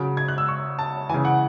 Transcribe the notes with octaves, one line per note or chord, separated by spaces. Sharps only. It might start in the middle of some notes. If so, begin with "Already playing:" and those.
Already playing: C#3 F#3
G#6
F#6
E6
C#6
A5
C#3 E3 G#5
F#5